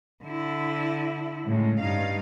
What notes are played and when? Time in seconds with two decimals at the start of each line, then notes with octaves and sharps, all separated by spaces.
0.24 D3 E4
1.45 A2 C#3 G#3
1.80 G2 D#4 F5